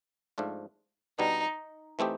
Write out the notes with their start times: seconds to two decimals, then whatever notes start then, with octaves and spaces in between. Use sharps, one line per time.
0.38 G#2 F3 A3 D4 F4
1.19 B2 G3 B3 D4 D#4
1.99 E3 A3 C4 D#4 G4